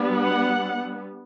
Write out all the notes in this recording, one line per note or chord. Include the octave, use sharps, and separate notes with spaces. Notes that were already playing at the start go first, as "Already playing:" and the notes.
Already playing: G3 B3 D4
F#5